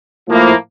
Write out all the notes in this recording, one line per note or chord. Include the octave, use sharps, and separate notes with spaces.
A2 F3 A#3 E4